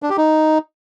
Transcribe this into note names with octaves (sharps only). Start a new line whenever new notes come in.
D4
G4
D#4